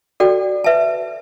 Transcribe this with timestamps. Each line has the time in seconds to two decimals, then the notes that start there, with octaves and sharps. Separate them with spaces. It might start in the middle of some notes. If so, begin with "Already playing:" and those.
0.20 F#4 A4 D5 G5
0.64 B4 E5 A5